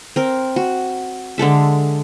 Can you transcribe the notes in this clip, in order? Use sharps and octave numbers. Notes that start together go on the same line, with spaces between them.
C4 A#4
F#4
D3 G#3 A4 E5